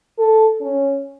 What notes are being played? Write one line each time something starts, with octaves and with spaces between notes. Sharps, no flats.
A4
C#4